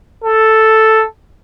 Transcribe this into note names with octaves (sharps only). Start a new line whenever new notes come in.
A4